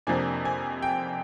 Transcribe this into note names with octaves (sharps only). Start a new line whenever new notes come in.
F2 C3 F3 A#3 D4 G#5
G#5
G5